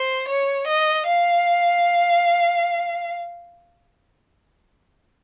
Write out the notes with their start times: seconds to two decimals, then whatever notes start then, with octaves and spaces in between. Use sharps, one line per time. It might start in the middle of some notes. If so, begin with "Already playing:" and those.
Already playing: C5
0.28 C#5
0.67 D#5
1.07 F5